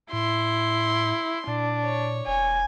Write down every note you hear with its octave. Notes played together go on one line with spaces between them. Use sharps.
A2 E4 C6
A#2 D4
C#5
E1 G#5